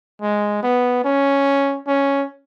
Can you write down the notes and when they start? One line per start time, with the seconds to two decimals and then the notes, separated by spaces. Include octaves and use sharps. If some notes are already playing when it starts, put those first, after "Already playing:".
0.22 G#3
0.63 B3
1.05 C#4
1.87 C#4